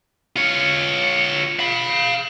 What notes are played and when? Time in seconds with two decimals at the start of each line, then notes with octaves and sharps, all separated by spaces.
0.36 F4 C#5
1.59 F5 B5